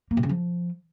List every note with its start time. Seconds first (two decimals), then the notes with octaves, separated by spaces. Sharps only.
0.11 A#3
0.17 C3
0.23 C#3
0.29 F3